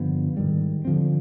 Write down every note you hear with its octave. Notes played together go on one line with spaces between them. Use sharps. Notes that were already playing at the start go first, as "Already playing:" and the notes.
Already playing: G2 D3 F3 B3
G#2 D#3 G3
D3 F3 C4